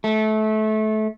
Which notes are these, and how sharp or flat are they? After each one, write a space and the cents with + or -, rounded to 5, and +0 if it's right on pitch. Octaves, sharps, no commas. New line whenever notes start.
A3 -25